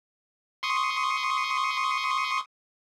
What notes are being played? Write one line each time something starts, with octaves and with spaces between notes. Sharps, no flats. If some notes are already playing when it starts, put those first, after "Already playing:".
C6 C#6 D#6